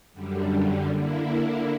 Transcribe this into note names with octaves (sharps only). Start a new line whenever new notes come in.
F#2 D3 G3
D3 A#3 E4